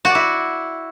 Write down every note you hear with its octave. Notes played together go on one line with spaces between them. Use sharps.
F#4
D5
E4